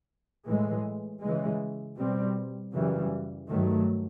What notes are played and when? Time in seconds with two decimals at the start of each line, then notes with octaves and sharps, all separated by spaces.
0.46 A2 E3 G#3
1.21 C#3 E3 G#3
1.97 B2 G3 C4
2.72 F#2 C#3 E3 G3
3.49 G2 D#3 F#3 A3